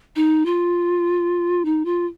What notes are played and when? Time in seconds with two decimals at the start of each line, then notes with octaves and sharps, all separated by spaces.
0.16 D#4
0.46 F4
1.65 D#4
1.85 F4